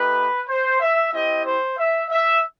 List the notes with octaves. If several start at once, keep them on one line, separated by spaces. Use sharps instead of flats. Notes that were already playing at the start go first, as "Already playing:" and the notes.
Already playing: A3 D#4 G4 B4
C5
E5
C4 E4 G4 D#5
C5
E5
E5